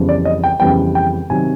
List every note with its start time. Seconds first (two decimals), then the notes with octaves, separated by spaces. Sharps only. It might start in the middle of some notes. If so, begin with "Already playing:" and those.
Already playing: F2 C#3 E3 G3 B3
0.09 D5
0.25 D#5
0.44 G5
0.60 F2 C#3 E3 G3 B3 G5
0.95 G5
1.30 C3 D#3 F#3 G#5